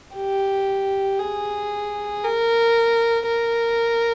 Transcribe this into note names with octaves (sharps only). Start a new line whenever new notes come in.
G4
G#4
A#4
A#4